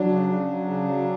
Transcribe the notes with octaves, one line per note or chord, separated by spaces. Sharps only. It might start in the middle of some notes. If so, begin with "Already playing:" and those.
Already playing: F#3 D4
C#3
C#3
F#3
C#3
F#3